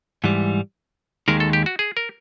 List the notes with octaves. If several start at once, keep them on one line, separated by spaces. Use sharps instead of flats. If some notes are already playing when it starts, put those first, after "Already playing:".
G#2 E3 G3
D#2 D#3 G#3 A#4
A4
G4
F#4
G#4
A#4